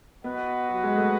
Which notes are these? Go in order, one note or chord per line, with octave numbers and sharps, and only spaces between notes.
B3 F#4 B4 D#5 F#5
F#3
G#3
A3